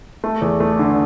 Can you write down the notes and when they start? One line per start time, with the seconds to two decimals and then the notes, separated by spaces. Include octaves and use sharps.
0.24 A3
0.42 E2
0.60 A3
0.79 D3